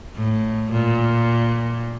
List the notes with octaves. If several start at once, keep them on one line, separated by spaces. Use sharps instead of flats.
A2
A#2